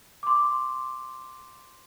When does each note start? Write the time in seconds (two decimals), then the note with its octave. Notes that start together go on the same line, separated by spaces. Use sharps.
0.23 C6 D6